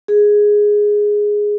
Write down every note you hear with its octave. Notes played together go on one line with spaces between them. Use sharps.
G#4